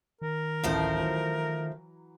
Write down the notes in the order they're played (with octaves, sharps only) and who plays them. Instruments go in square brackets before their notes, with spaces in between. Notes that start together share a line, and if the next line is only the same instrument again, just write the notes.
[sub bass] D#3 [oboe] A#4
[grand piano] D1 A1 A2 [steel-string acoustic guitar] F3 A3 C5
[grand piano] E3 F#3 A#5